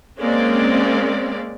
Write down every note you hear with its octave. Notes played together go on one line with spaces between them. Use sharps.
G#3 A#3 C4 C#4 D5